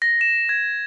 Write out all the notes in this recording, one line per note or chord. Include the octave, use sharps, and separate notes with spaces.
A#6
E7
G#6